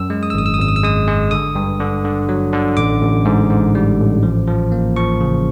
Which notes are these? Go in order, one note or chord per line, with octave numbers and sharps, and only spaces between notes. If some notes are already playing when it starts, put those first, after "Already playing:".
Already playing: F#2 E6
G#3
D#6
E6
G#1 D#6
E6
D#6
G#1 E6
D#6
E6
G#3 D#6
G#3
D3 D#6
G2
D3
D3
F#3
D3
A1 D6
A1
G#2
G#2
G3
A1
F3
F3
A#3
F3 C#6
C#3